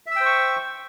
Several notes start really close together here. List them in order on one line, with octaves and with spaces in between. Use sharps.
E5 E6 G5 C5 C#6